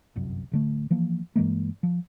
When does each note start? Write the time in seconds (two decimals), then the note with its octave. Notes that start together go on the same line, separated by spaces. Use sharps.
0.16 G1 C2 F#2
0.51 D1 D3 A3
0.91 E3 F3 A#3
1.36 G2 E3 G#3 A#3
1.83 F3